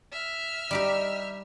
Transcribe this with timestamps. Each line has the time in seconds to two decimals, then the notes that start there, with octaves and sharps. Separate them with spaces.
0.12 E5 F6
0.71 G3 D#4 G4